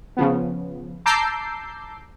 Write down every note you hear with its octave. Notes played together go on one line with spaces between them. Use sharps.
C#3 F3 B3
A5 A#5 D6 E6 G6 C7